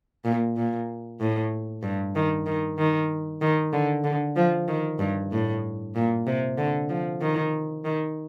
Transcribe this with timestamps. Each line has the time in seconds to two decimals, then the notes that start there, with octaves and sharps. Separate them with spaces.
0.25 A#2
0.56 A#2
1.20 A2
1.83 G2
2.15 D#3
2.46 D#3
2.78 D#3
3.42 D#3
3.73 D3
4.04 D3
4.36 F3
4.68 D#3
4.99 G2
5.32 A2
5.95 A#2
6.27 C3
6.58 D3
6.89 F3
7.21 D#3
7.85 D#3